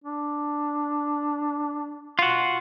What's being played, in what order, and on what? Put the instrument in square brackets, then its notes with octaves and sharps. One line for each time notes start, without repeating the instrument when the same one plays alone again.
[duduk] D4
[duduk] B2 [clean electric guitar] F4 F#4